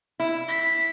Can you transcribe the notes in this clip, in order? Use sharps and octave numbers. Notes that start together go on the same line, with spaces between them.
E4
B6